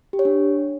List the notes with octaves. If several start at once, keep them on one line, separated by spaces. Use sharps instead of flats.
G4
C#5
D4